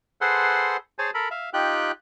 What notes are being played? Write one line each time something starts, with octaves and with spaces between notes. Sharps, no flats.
G#4 A4 B4 C5 F#5 C6
G#4 C5 C#5 G#5 A5
A4 A#4 B5
E5 F5
D#4 F4 G4 G5 F#6